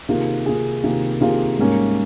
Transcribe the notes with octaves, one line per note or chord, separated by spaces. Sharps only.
C3 D#3 A#3 F4 G#4
C3 D#3 A#3 F4 G#4
C3 D#3 A#3 F4 G#4
C3 D#3 A#3 F4 G#4
G#2 G3 A#3 C#4